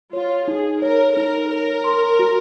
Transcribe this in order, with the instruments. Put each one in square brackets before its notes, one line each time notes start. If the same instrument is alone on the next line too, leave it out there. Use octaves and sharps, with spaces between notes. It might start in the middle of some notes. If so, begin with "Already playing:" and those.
[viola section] F4 [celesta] C#5
[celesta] D#4 [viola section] G#4
[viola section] A#4 [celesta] C#5
[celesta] D#4 [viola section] A#4
[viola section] A#4 [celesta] C#5
[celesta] C6
F#4